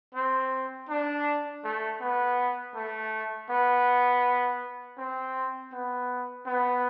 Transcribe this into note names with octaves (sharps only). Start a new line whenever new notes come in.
C4
D4
A3
B3
A3
B3
C4
B3
B3